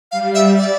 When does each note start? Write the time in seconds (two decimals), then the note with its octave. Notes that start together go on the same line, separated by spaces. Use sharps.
0.12 G3 F5
0.34 E5
0.57 D5